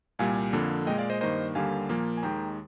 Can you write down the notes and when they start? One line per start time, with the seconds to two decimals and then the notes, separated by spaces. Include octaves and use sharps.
0.19 C2 A#2 G3 F5 G#5
0.53 F2 D3 F3 A#3
0.87 A#2 G#3 D#5 G5
0.98 D5 F5
1.10 C5 D#5
1.21 G2 D#3 A#3 C5 D#5
1.55 D#2 D3 G3 A#3 F5 G#5
1.89 A#2 F3 A#3
2.17 G#5
2.23 D#2 D#3 G#3 G5 A#5